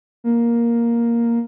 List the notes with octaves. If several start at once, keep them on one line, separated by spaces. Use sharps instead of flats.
A#3